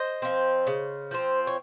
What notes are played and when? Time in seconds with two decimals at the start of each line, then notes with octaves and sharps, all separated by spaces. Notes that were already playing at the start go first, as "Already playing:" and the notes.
Already playing: C5 D#5
0.22 F3 C4
0.67 C#3
1.11 F3 C4
1.47 C#5